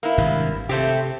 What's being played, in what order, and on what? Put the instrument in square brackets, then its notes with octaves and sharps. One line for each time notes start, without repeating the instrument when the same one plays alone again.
[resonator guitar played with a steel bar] A#3 B3 E4
[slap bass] G#1 G2 C3
[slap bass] C3 [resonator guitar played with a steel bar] A3 C4 G4